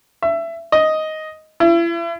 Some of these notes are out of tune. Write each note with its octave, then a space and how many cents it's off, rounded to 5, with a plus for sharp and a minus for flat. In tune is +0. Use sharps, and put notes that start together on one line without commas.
E5 +20
D#5 +5
E4 +40